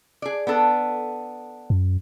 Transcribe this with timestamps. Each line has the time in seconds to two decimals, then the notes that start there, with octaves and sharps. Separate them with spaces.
0.22 G#4 D5
0.47 B3 D4 A4
1.70 F#2